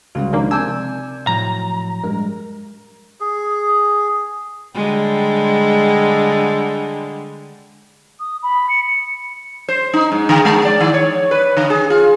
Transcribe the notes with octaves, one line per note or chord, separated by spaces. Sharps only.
C#2 G3 C#4 F#4
D3 D#3 F3 G#3 A#3 A#4
C3 D5 G#5 D6 E6 G6 G#6
A2 F3 F#3 A#5
G2 G3 G#3 A#4
G#4
D3 G3 G#3
D#6
B5
C#7
C#7
C5
D#4
G#2
D3
G#3
D5
D#3
C#5
B4
D3
G#4
F4